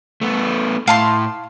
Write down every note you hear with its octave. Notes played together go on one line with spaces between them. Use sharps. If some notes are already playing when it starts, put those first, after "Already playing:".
A3 B3
A2 F5 A5 C6